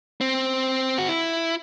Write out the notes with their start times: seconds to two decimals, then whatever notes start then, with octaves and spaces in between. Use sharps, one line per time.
0.21 C4
0.98 F#4
1.08 E4